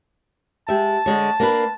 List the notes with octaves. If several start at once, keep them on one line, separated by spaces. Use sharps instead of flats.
G#3 G4 E5 A5
D3 G#3 C#5
A#3 D4 B4